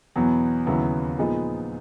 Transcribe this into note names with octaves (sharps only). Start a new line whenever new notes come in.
E2 B2 F#3 B3
D#2 C#3 F#3 B3 E4
A#2 F3 G#3 B3 D#4